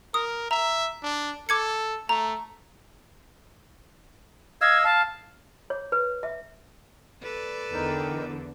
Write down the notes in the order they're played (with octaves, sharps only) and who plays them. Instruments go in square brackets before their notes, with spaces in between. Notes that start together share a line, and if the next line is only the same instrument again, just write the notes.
[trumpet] A#4 [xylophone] D#6
[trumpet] E5 [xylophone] A#5
[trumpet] D4
[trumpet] A4 [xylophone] D6 G#6 C#7
[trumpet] A3 [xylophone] A#5
[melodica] D#5 F5 E6 [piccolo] G#6
[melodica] F5 [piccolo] A5
[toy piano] C#5
B4
E5
[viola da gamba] A4 B4 D5
[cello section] E2 D3 [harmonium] D#4 A#4 G5